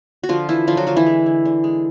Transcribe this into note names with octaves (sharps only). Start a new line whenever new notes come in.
F#4
D3 F3 F4
E3 F3 E4
D3 F3 F4
F#3 F#4
D3 F3 F4
E3 E4
G#3
D3
D3
G#3